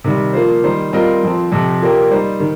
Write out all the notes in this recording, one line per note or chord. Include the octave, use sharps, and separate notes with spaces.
C3 D#3 G3
F3 A#3 F4 C5
D#3 G3 D#4 C5
G3 C4 F4 A#4 D#5
F2 F3 C4
F2 C3 F3 C4
A#2 A#3 G4 A#4
G3 D#4 C5
D#3